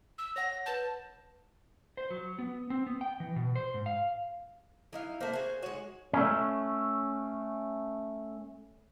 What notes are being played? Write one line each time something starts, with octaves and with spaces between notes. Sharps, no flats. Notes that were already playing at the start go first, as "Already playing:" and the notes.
E6
C#5 F#5 A#6
B4 A5 G6
C5
F#3
B3
C4
B3
G5
E3
B2
C5
G#2
F5
F#3 D#4 E4 F5
A3 A#3 C5
F#4 G#4
G#3 F#4 C#5
A3 C#4